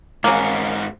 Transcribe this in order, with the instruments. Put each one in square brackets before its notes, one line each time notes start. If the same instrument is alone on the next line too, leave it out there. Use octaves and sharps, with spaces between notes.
[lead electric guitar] G#2 F#4 [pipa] C#3 A#3